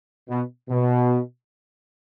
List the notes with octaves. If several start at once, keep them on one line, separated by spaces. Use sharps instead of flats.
B2
B2